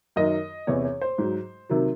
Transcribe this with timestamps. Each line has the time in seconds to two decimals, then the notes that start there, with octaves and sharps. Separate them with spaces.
0.16 F#2 D#3 F#3 D#5
0.67 E2 C3 E3 C#5
0.85 C#5
1.01 C5
1.18 G#2 F#3
1.70 C3 D#3 F#3